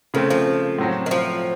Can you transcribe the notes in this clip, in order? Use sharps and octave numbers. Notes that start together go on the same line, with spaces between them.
C#3 F3 A3 C4
F3
A2 F#3 C4
D#3
F3